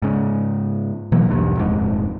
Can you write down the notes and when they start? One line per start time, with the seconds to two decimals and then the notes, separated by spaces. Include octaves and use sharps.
0.02 G#2 C#3
1.12 B2 E3 F#3 A#3
1.26 B1 E2 G2
1.55 D#1 F2 G#2